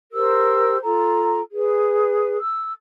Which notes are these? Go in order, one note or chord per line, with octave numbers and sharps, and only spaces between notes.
G4 A#4 C5 E6
F4 A4 A#5
G#4 B4
E6